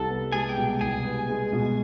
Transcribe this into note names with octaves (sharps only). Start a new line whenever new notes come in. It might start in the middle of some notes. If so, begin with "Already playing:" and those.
Already playing: C2 A4 A5
B3
G#3 G#4 G#5
G4 G5
B2
C2 G#4 G#5
B3
G#3
B2